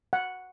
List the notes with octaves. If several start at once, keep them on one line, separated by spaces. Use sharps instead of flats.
F#5